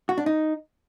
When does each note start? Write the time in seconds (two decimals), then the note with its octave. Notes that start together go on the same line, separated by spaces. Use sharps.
0.09 F#4
0.18 D4
0.26 D#4